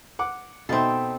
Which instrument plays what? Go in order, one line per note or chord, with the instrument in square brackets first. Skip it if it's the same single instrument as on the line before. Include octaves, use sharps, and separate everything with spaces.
[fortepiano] F#5 D6
[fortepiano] B2 D#4 E5 [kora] C4 A4